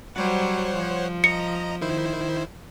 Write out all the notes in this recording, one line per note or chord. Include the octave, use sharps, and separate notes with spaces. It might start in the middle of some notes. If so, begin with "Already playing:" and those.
F#3 G3 C5 C#5 F#5
F3
D#5 A#5 C#7
D#3 E4 C5